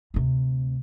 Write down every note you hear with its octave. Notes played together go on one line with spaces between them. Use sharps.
D2 C3